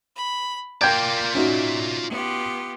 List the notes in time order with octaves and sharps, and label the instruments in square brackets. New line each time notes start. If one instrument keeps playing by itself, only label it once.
[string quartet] B5
[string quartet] A#3 [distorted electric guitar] F4 D5 [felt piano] G5 G6 G#6
[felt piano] C#4 D#4 F#4 [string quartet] E5
[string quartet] B3 F4 G4